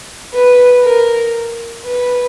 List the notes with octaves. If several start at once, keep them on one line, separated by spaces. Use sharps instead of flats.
B4
A#4
B4